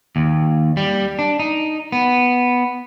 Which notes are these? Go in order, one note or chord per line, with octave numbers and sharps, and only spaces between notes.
D#2
G3
D4
D#4
B3